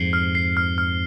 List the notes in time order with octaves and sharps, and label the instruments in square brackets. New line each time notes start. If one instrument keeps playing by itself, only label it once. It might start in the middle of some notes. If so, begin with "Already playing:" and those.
Already playing: [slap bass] F2 G#2 [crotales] C7
[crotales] F6
C7
F6
F6